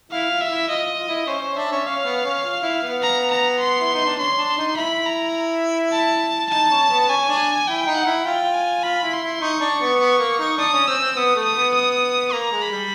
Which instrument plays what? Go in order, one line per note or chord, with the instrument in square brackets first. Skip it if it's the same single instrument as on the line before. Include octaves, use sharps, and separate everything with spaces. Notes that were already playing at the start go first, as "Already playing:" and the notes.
[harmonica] E4 [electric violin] F5
[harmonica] F4
[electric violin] E5
[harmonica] E4
[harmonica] F4 [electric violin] D#5
[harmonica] F4
E4
[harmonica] C#4 [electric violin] C5
[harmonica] C#4
[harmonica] D4 [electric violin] E5
[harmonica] C#4
[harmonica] C#4 [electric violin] F5
[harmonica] B3
C#4
F4
E4
B3
[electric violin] A#5
A#5
C6
[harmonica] E4
D#4
D4
[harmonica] C#4 [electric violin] C6
[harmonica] D4
D#4
[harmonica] E4 [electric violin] B5
[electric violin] A#5
A5
[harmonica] D#4 [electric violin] A5
[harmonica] C#4
B3
[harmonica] C#4 [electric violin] G#5
[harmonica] D4
[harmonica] E4 [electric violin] G5
[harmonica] D#4
[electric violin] F#5
[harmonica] E4
[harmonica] F4 [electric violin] G5
[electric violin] G#5
[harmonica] F4 [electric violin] B5
[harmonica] E4
[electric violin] C6
[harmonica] E4
[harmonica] D#4 [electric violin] C#6
[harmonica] D4
B3
B3
A#3
D#4
[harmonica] D4 [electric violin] D#6
[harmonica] C#4
[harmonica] C4 [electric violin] E6
[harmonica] C4
[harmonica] B3 [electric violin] D#6
[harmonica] A3
[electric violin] D#6
[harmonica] B3
[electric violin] D#6
[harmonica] A#3 [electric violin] A#5
[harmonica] G#3
[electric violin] B5
[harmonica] G3